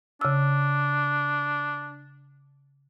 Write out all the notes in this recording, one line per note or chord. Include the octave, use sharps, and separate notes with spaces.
C#3 D4 E6